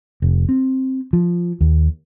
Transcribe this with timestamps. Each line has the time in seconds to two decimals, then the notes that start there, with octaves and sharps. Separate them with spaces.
0.22 F1
0.49 C4
1.13 F3
1.61 D#2